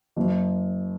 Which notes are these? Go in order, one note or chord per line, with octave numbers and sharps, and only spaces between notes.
F#1